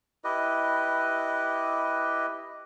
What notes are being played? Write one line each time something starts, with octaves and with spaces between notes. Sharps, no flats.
E4 G4 B4 D#5